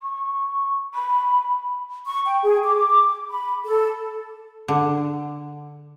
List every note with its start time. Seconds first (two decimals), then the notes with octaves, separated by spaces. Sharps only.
0.03 C#6
0.94 B5
2.06 C#6
2.25 G5
2.43 G#4
2.64 D6
3.30 B5
3.65 A4
4.68 D3